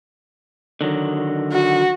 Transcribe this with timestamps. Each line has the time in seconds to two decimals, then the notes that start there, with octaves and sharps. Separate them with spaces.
0.81 D3 D#3 F#3
1.53 F#4